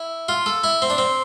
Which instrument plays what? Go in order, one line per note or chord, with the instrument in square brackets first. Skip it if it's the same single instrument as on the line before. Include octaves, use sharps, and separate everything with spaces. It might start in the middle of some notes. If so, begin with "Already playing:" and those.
Already playing: [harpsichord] E4
F4
A4
E4
C4
D4
C4